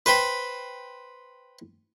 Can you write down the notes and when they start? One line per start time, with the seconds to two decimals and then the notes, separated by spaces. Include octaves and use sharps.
0.06 B4 C5 G5 B5